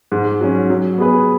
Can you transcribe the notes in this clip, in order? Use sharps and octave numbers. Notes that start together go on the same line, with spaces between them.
G#2
F#3 C#4
F#3
B3 G#4 B4